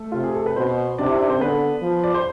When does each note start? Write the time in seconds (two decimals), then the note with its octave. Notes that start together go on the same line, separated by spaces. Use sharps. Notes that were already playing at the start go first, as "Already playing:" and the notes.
Already playing: A3 A4
0.12 C3 F4
0.24 G#4
0.35 A4
0.46 B4
0.56 B2 C4 C5
0.98 C3 D4 D5
1.09 E4 E5
1.20 D4 D5
1.30 C4 C5
1.40 D3 B3 B4
1.82 F3
2.04 D5
2.14 C5